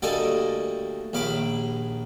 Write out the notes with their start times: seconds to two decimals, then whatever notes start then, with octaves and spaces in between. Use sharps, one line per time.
0.02 D2 G3 A#3 A4 D#5 G#5
1.13 A#1 D#2 F5 B5 D6